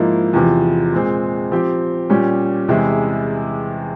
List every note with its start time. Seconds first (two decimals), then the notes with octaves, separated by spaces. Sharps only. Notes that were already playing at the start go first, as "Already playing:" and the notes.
Already playing: G#2 F3 A#3 E4
0.33 E2 C3 F3
0.92 A#2 G#3 C4
1.51 F3 C4 G4
2.10 A#2 G3 C#4 G4
2.68 E2 C3 E3 G#3 E4